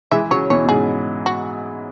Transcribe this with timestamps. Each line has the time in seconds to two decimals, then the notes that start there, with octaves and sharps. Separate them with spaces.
0.11 E3 G#3 E5
0.31 C#3 F#3 C#5
0.50 B2 E3 C#5
0.65 B2
0.69 G#2 C#3 G#4
1.26 F#4